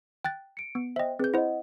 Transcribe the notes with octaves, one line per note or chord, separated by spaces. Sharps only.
G5 F#6 A6
C#7 D7
B3
C5 D#5 E5 G5
C4 G#4 B4 G6
E4 C5 D#5 F#5